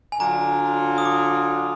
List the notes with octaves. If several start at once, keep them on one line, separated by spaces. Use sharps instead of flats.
G#5
D3 F#3 D4 F4 A#5
D#6
D6